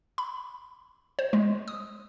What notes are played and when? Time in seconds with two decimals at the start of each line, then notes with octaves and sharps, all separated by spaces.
0.18 B5
1.19 C5
1.33 G#3
1.68 D#6